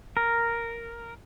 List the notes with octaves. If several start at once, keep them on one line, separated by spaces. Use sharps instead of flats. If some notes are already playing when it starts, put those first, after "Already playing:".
A#4